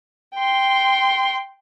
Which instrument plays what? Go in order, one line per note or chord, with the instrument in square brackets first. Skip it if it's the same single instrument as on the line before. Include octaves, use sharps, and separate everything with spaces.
[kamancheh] G5 C6